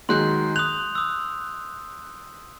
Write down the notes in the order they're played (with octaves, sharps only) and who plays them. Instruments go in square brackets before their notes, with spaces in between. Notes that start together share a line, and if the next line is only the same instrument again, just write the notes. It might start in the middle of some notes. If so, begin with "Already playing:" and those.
[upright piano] D#3 F#3 G#3 [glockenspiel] C6 F#6 G6
[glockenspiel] D#6 F7 [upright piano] F#6
[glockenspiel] D#6 E6